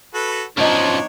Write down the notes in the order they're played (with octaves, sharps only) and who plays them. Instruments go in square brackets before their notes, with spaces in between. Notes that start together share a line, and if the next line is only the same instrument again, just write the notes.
[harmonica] F#4 A4 B4
[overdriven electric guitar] F#2 F3 [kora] B3 D#4 [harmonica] D4 C#5